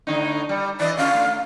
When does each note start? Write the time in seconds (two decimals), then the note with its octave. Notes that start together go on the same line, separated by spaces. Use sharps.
0.07 A2 D3 D#4
0.49 G3
0.80 E3 D5 D#5
0.97 D3 C#4 F5
1.15 A3